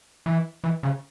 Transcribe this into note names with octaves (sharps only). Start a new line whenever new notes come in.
E3
E3
C#3